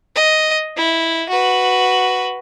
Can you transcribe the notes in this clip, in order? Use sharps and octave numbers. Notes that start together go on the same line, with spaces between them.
D#5
E4
F#4 B4